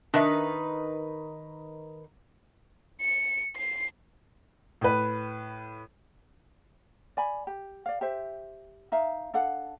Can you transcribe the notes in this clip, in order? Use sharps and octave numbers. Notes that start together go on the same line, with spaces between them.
D#3 D4 D#4 B4 E5
C#7
C7
A2 B4
D5 G#5 B5
G4
D5 F5
G4 C5 E5
D#4 E5 F5
D4 A4 F5 F#5